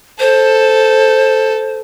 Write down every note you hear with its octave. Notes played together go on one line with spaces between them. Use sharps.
A4 C5